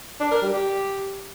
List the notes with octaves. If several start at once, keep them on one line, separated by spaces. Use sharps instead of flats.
D4
A#4
G3
G4